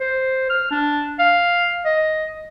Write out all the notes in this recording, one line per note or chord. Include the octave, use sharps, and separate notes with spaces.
C5
F6
D4
F5
D#5